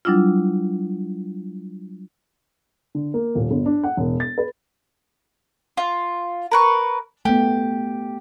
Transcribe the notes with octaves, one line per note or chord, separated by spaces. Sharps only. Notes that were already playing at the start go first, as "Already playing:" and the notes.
F#3 G3 D4 E4 F4
D3
A#3
D#1
G1
D4
F#5
E1
A6
B4
F4
A#4 B4 C#6
A3 B3 G4